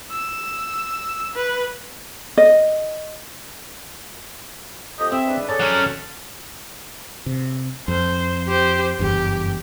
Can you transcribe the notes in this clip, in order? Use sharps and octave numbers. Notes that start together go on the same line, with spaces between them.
E6
B4
D#5
F2 G4 D#5
C4 E5
G#2 D4 B4
G#4 A4 C#5 D5 A5
F#3 C#4
C3
F2 C5
G4 C5
F#1 E2 G2 G4